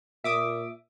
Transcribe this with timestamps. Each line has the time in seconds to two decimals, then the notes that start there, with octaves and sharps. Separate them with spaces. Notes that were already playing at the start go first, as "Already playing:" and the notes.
0.24 A#2 E5 D6 D#6